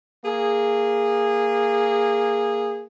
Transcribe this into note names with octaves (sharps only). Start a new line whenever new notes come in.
A#3 G#4